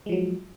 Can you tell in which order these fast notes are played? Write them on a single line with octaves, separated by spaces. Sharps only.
G#3 F3 F#3